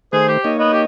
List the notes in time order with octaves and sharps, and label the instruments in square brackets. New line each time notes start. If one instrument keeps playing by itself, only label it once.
[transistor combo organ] D#3 A3 [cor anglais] G#4 [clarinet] C5
[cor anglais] G4
[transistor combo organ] A#3 D#4 C#5 [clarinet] D#5
[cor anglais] B3 [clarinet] D#5
[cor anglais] G4